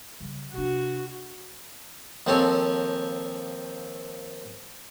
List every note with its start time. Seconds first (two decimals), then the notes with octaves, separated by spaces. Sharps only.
0.20 C#3 G3
0.53 C3 D4 F#4
2.27 D#2 F3 C4 A4 C#5 G#5